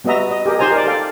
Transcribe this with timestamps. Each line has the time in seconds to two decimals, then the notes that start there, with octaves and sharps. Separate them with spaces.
0.04 G3 B3 F#4 D#5 E5 A#5
0.31 D#5
0.46 G4 G#4 A#4 D#5
0.59 D#4 G4 C5 G#5 A#5
0.72 A#4 D5
0.87 A4 D5 F5 G5